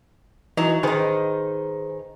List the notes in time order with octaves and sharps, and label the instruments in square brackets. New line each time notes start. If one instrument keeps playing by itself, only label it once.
[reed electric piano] E3 D#4 [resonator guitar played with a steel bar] F#3
[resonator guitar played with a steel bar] D#3 D#4 [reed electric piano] G#4 B4 C5